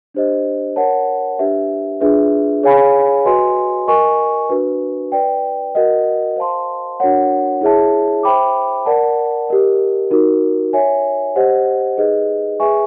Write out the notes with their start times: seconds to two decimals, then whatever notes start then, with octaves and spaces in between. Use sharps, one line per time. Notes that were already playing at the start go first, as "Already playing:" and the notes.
0.14 D4 G4 C5 D#5
0.76 A#4 C#5 F#5 A5
1.39 D4 G4 B4 E5
2.00 D4 F4 G#4 B4 E5
2.63 G#4 C#5 F5 G#5 B5
3.25 F#4 B4 D#5 G#5 C6
3.87 A#4 D#5 G#5 C#6
4.50 D4 F#4 B4
5.12 B4 D5 G5
5.75 F#4 A#4 D#5 F#5
6.36 C5 F5 A5 C6
7.00 D4 F#4 A#4 C#5 F#5
7.61 E4 G#4 C#5 E5 A5
8.23 C5 E5 G5 B5 D6
8.86 A#4 D5 F#5 A5
9.49 G4 A#4 D#5
10.11 D#4 F#4 A#4
10.73 C#5 E5 G#5
11.36 G4 C5 D#5 F#5
11.97 D#4 G#4 B4 D#5
12.60 G#4 B4 E5 G#5 C#6